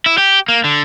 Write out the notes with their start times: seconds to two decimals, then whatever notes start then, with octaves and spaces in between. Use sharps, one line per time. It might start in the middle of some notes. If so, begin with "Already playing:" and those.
0.06 E4
0.18 G4
0.48 A#3
0.64 D3